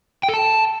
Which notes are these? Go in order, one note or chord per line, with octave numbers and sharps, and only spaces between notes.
G5
A4
A5